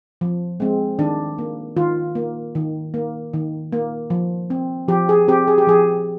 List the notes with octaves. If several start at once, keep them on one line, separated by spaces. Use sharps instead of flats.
F3
G#3 C4
D#3 D4
A#3
D#3 F4
A#3
D#3
A#3
D#3
A#3
F3
C4
F3 G4
G#4
C4 G4
G#4
G4
F3 G#4